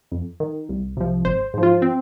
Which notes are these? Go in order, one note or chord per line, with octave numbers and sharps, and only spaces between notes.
F2
D#3
C2
C3 F3
G#1 C5
G#2 F3
F4
C4